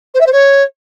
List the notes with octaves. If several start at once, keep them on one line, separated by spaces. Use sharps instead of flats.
C5
E5
C5
C#5